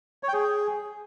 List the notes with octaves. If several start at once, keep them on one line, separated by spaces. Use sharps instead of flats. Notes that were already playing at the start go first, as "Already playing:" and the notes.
C#5
G5
G#4